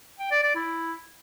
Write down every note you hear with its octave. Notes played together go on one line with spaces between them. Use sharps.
G5
D5
D5
E4